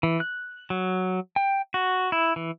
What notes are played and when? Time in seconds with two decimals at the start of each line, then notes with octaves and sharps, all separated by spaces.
0.03 E3
0.20 F#6
0.70 F#3
1.36 G5
1.74 F#4
2.12 E4
2.36 E3